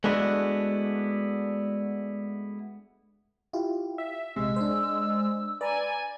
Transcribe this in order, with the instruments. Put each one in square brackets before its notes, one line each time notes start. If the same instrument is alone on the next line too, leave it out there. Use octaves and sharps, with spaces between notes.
[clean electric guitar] G#3 A3 B3 D4 E4 F#4
[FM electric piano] E4 F4 G4
[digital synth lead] E5
[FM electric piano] A#1 C3 [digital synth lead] G#3 [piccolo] E6
[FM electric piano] D4 C5
[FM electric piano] B4 A#5 [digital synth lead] D5 [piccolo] G#5